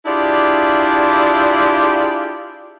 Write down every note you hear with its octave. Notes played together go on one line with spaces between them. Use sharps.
D4 E4 F4 G4 G#4 D5